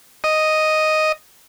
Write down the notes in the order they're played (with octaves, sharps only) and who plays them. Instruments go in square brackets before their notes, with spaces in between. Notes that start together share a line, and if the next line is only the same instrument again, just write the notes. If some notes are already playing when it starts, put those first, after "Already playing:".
[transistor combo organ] D#5